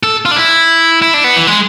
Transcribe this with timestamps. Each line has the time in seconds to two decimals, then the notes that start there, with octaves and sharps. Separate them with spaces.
0.03 A4
0.25 F4
0.31 D4
0.36 E4
1.02 E4
1.14 D4
1.24 B3
1.36 E3
1.47 G#3